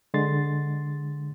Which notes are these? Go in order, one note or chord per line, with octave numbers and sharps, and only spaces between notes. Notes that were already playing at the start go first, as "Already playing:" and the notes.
D3 G#3 C6 A6